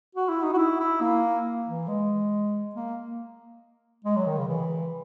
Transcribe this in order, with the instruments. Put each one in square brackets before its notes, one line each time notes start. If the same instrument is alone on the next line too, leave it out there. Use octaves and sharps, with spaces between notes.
[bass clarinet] F#4
E4
D#4
F#4
E4
E4
A#3
E3
G#3
A#3
G#3
F#3
D#3
C#3
E3